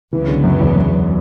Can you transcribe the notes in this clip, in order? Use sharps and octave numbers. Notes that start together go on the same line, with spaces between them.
C#2 C#3 E3 F#3 B3
D3
F#2
E2
F#2